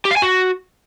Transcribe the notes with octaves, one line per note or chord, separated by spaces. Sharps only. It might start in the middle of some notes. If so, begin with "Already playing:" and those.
G4
F5
G#5
F#4